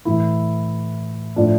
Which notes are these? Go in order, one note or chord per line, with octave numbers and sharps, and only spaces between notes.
A2 E3 E4
A2 F3 D4